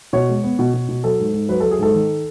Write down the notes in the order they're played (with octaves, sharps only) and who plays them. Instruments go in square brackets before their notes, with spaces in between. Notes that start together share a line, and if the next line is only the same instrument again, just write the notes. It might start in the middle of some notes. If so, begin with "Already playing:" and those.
[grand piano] B2 C#5
G#3
B3
B2
B2
B2
F#3 A4
G#2
G#2
F#3 B4
F#3 A4
G#4
G#2 A4
D#3